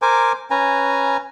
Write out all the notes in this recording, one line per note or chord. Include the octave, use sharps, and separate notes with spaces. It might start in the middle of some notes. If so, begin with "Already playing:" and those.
A#4 C5 G#5 D6
C#4 B4 G#5 A#5